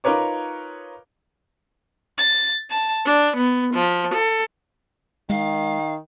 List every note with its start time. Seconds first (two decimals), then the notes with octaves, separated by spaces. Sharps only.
0.04 D#4 F4 A#4 B4 C#5 D6
2.17 A6
2.70 A5
3.05 D4
3.36 B3
3.74 F3
4.13 A4
5.30 D#3 G#3 F5